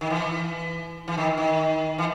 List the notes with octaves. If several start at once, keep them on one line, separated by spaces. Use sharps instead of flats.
D#3
E3
E3
D#3
D#3
E3